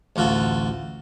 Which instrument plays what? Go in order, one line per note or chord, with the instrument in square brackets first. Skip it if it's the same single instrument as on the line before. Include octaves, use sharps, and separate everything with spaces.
[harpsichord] A1 D2 F4 F#4 A4